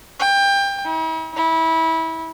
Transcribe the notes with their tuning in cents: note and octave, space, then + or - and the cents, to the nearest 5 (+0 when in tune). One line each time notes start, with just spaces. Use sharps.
G5 +25
E4 -45
E4 -25